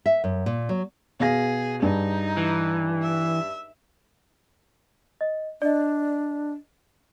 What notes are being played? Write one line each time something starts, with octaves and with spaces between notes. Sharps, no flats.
E5
F#2
A#2
F#3
B2 G#4 F5 A#6
G2 D#4
E3
E5
D#5
D4 D5 D#5